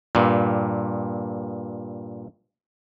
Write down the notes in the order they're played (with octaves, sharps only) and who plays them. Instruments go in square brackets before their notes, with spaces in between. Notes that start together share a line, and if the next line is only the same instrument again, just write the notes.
[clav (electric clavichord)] G2 A#2